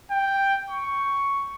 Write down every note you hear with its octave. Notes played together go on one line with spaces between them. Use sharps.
G5
C#6